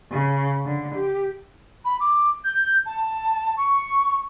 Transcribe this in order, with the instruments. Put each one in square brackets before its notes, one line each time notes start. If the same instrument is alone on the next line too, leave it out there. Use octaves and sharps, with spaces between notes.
[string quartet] C#3
D3
G4
[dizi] B5
D6
G6
A5
C#6